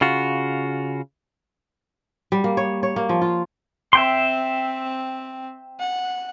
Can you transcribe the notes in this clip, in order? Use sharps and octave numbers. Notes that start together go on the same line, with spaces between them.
C#3 F4 F#4
G3
A#3
C#5
C#5
A#3
F3
F4
C4 E5 G5 C6
F#5